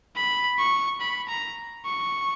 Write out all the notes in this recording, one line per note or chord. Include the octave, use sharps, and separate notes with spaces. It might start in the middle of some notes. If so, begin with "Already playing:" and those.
B5
C#6
B5
A#5
C#6